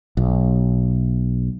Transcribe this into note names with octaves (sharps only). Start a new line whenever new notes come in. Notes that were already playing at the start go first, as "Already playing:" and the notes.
B1